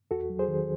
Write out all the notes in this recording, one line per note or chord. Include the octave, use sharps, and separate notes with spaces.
E2 F#4 A4
F#3
G#4 C5
D#3